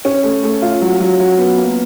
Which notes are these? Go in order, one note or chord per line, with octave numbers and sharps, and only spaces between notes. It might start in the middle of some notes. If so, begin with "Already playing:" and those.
C#4
A3
A3
F4
F#3
F#3
F#3
B3
A#3